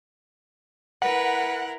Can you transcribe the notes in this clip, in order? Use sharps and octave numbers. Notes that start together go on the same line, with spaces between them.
E4 A#4 B4 F#5